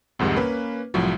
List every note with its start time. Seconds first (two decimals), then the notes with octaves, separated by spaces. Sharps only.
0.19 C2 F2 G#2 D#3 G3
0.36 A#3 C#4 B4
0.94 C2 A2 F3 F#3